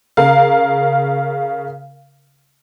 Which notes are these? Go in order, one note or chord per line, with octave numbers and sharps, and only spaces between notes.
C#3 A#4 F5